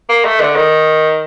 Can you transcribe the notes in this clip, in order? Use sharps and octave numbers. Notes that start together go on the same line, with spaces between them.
A#3
A3
D3
D#3